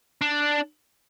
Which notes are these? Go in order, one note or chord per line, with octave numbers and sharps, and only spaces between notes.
D4